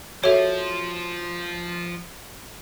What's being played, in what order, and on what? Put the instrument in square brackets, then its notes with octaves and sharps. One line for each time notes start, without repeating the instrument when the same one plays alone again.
[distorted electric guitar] F3 [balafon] F#4 G#4 A4 [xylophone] C#5 E5